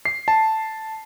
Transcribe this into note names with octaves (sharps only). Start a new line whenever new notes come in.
C7
A5